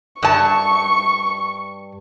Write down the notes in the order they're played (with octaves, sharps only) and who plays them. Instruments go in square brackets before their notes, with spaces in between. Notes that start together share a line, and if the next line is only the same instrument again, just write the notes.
[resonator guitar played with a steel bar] G2 A5 [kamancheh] C#6